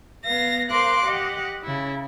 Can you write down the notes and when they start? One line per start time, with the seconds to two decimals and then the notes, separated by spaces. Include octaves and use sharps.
0.24 B3 F5 A#6
0.71 A#4 C5 F5 C6 D6 F#6
1.05 G4 D#5 F#5
1.64 C#3 E4